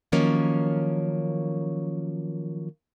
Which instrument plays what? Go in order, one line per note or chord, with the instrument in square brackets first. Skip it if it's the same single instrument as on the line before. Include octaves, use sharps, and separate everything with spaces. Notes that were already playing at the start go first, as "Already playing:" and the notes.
[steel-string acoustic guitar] D#3 F3 F#3 A#3 C#4 C#5